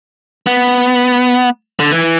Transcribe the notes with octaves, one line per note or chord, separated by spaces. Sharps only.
B3
D3
E3